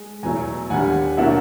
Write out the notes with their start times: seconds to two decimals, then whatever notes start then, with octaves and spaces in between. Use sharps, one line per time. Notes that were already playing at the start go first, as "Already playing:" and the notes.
Already playing: G#3
0.23 E2 B2 F#3 A3 G#5 A#5
0.70 D#2 D3 G3 F#5 G#5
1.18 B2 F#3 A#3 D4 E5 F#5